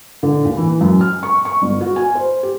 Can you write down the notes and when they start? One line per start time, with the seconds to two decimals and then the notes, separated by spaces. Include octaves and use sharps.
0.23 D3
0.45 D#2
0.57 E3
0.81 F#2
1.01 F6
1.23 C#6
1.45 C#6
1.62 G1
1.81 F#4
1.96 G#5
2.15 C5
2.43 G4